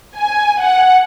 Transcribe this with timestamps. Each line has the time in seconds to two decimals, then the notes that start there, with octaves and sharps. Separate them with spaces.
0.17 G#5
0.62 F#5